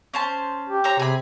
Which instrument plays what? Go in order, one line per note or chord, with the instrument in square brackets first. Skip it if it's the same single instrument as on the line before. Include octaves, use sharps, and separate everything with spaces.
[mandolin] C#4 C5 A5
[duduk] G4
[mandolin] C5 C#5 A#5
[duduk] C3 [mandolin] G#4 B5